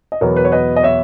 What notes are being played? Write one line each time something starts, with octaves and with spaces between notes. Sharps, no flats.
D#5
E2 B2 F#3 B3 A#4 C#5
B4
C#5
B4 D#5
D#5
C#5 E5